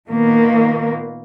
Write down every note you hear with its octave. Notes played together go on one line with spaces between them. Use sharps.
A#2 D#3 A#3 B3